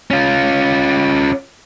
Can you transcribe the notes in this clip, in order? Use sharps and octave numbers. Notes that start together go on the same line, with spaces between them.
C#4 F4